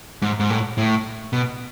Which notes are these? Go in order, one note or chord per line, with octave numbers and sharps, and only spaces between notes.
G#2
G#2
A2
A2
B2